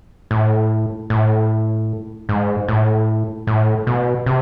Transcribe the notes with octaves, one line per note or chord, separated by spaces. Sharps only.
A2
A2
G#2
A2
A2
B2
C3